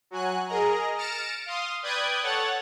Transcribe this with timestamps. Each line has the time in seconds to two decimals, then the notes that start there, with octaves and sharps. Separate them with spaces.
0.11 F#3 F#4 G#5 F#6
0.48 G#4 A#4 D#5 A#5
0.97 F6 A6 A#6 C#7 D7 E7
1.46 F5 C6 D#6 F6
1.83 B4 D5 G5 D#6 F#6 G#6
2.23 A4 C#5 F#5 F#6 A6